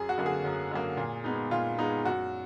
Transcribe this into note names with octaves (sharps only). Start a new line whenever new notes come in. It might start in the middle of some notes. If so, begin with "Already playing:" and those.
Already playing: F#2 G#4
F#4
D3 F#3 A#3
G#4
F#2
D3 F#3 A#3
A#2
G#3 B3 D#4
A#2 F4
G#3 B3 D#4
F#2 F#4